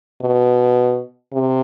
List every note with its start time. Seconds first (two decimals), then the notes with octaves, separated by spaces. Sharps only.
0.21 B2
1.33 C3